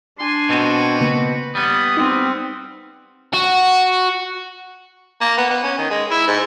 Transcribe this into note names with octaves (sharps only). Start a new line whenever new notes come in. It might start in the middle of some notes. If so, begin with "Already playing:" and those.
D4 G#5 C6
B2 C4 F#4
C#3 A#3 B4 C#7
G3 B3 D#6
C4 D#4
F#4
A#3
B3
B3
C#4
D#3
G#3
E4
G#2